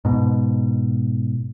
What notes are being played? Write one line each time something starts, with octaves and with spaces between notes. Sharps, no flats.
G#2 B2